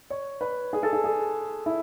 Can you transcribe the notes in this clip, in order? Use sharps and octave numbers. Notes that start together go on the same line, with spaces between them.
C#5
B4
G#4
A4
G#4
G#4
E4